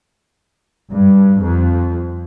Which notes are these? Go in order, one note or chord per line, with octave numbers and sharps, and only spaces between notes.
G2
F2